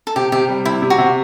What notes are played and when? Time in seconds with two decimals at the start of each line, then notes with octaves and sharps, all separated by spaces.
0.07 A4
0.16 C3 G4
0.32 C3 G4
0.49 G3
0.65 C3 E4
0.82 C3
0.90 F#4
0.98 C3